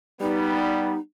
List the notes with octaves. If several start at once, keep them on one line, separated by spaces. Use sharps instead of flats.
G3 B3 D#4